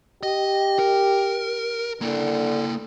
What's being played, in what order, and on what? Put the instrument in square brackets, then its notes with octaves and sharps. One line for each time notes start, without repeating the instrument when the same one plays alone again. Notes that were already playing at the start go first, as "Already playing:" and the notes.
[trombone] G4 [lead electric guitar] D#5
[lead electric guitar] A#4
[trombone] D3 [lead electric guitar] A#3 E4